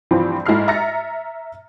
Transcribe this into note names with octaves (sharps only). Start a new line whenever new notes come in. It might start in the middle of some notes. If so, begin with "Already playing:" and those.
G2 E3 F3 C4
G#2 E4 A4 F6 C7
E5 A#5 F6 A6 A#6 C#7